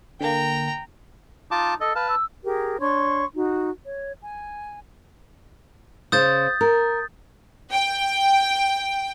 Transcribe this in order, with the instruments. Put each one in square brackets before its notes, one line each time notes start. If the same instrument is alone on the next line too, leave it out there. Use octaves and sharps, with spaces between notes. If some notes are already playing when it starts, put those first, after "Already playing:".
[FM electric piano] D3 A#3 [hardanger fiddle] G5 A#5
[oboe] D#4 [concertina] F4 A5 D6
[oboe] A4 [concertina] D#5
[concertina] B4 A5 [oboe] F5
[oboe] E6
[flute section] G4 G#4 A#4
D4 C#5 C6 C#6
D#4 F#4
C#5
G#5
[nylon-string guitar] C#3 C5 [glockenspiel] D#6 G6 A6
[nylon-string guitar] A#4
[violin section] G5